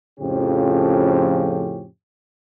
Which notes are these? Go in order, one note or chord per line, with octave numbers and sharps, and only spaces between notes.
F2 A2 C#3 F3 C#4 G4